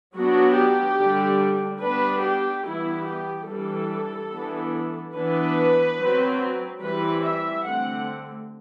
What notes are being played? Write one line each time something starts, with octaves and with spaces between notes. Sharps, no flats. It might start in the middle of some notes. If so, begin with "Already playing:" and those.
F#3 B3 D4 F#4
G4
D3 G3 D4
G3 B3 D4 B4
G4
E3 G3 B3 E4
G4
E3 G3 D4 A4
E3 B3 D4
E3 B3 D4 B4
F#3 C4
E3 G3 C4 B4
E5
D3 A3 C4 F#5